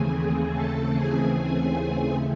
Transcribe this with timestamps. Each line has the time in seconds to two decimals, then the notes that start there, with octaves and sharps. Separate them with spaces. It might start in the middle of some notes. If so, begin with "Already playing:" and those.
Already playing: D#2 C#3 E3 A3 C4 G#4 G#5
0.52 A4 A5
0.91 G#4 G#5